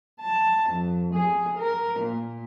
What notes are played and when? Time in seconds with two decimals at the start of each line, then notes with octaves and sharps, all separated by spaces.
0.20 A5
0.70 F2
1.13 G#4
1.57 A#4
1.99 A#2